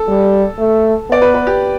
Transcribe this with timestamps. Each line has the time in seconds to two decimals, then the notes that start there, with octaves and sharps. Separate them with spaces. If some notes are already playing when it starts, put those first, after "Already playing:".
Already playing: A4
0.08 G3
0.59 A3
1.10 B3 D5
1.22 B4
1.34 B4
1.47 G4